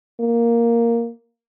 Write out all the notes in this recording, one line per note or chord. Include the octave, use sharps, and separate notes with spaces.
A#3